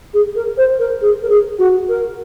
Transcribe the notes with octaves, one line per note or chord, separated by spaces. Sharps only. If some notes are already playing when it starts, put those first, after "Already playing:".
G#4
A#4
C5
A#4
G#4
A#4
G#4
F#4
A#4